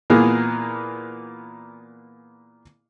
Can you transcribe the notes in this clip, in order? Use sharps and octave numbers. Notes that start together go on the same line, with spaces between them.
A#2 E3 A#3 B3 G#4